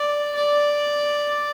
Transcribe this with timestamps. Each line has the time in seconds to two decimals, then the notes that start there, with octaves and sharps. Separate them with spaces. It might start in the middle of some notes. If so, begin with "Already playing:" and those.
Already playing: D5
0.35 D5